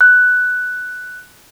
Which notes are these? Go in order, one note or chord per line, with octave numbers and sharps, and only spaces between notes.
F#6